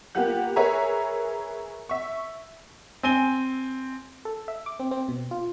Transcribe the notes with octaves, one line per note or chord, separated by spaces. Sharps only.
A#3 B3 F4 G4 F#5 F#6
G#4 A#4 B4 C#5 E5 A#5
E5 C#6
C4 G#5 D#7 G7
A4
E5
D6
C4
C4
B2
F4